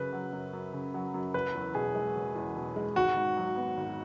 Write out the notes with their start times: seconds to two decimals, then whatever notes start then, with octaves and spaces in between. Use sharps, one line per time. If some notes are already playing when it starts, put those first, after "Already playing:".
Already playing: F#2 C#3 B4
0.13 F#3
0.33 F#2
0.53 F#2
0.74 C#3
0.94 F#3
1.14 F#2
1.34 F#1 B4
1.55 E2
1.75 B2 G#4
1.95 G#3
2.15 F#1
2.35 E2
2.56 B2
2.76 G#3
2.96 G#1 F#4
3.16 G#2
3.37 F#3
3.56 B3
3.77 G#1